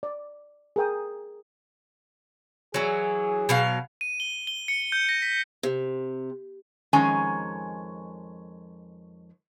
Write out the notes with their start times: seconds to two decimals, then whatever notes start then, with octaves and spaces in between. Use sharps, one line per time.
0.03 D5
0.76 G#4 A#4 G5 D#6
2.74 E3 F#3 G#4
3.49 B2 F#3 F5
4.01 D#7
4.20 G7
4.47 G7
4.68 C#7
4.92 G6
5.09 A#6
5.22 B6
5.63 C3
6.93 F2 D#3 G#3 C#4 G#5 A#5